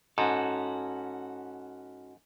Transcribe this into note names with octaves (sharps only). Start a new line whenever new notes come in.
G#2 C#4 F#4 A4